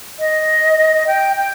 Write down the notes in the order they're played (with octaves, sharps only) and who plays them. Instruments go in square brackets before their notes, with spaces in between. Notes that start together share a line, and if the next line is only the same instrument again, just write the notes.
[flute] D#5
G5
G5